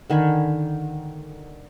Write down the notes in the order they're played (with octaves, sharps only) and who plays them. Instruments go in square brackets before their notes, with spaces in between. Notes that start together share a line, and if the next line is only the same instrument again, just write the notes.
[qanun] D3 D#3 G#5 B5